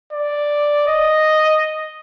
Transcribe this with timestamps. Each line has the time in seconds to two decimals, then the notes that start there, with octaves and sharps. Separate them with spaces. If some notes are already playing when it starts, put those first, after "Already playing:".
0.13 D5
0.88 D#5